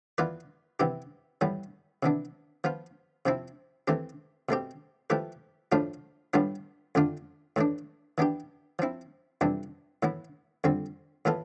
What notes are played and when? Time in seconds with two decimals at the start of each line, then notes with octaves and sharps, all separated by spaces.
0.18 E3 B3 F4 B4 D5
0.80 C3 E3 B3 E4 G4
1.41 A2 E3 G3 B3
2.03 C3 E3 B3 D4
2.64 F3 B3 F4
3.26 C3 F3 C4 E4
3.88 E3 A3 C4 G4
4.49 B2 A3 C4 G4
5.10 F3 A3 E4 G4 B4
5.72 A2 F3 A3 D4 F4
6.34 A2 G3 B3 D4 F4
6.95 F2 D3 A3 D4 F4
7.56 A2 E3 A3 D4
8.18 E3 B3 D4 G4
8.79 F3 C4 E4
9.41 F2 C3 E3 G3 D4
10.03 A2 E3 B3 E4
10.64 F2 D3 G3 C4
11.25 A2 E3 B3 F4 A4